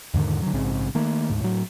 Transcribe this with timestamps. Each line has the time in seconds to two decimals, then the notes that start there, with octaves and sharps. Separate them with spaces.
0.14 E2 G#2 D3 D#3
0.42 D3 F#3
0.54 A#1 G#2 C#3 C4
0.95 D#3 A3 A#3
1.30 D2 G#2
1.41 A2 F#3